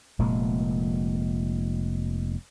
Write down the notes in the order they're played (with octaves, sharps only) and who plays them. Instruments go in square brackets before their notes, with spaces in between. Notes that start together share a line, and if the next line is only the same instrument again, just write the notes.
[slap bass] F1 A#2 G#3